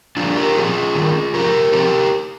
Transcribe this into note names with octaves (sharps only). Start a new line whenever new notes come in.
G2 D3 F3 D4 F4
G4 A#4
A#2 F3 C4 F4 G#4
G2 D#3 A#3
F2 C3 F3 G4 A#4
C3 F3 C4 G4 A#4